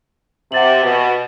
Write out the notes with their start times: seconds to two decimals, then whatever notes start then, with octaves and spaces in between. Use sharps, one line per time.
0.52 C3 F#5 A6 F#7
0.83 B2